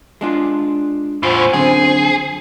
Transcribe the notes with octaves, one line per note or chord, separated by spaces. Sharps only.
G#3 D4 F4
E2 A2 F4 C5 G#5
F#2 D3 C4 G#4